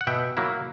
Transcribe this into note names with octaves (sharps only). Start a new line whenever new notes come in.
F#5
B2 E5 G5
F#3 A#3 E4